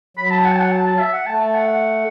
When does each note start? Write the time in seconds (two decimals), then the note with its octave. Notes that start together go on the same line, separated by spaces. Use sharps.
0.17 F#3 B5
0.31 A5
0.45 F#5
0.52 A5
0.59 F#5
0.72 A5
0.86 A5
0.99 E5
1.13 F#5
1.26 A3 A5
1.40 A5
1.54 F#5
1.68 F#5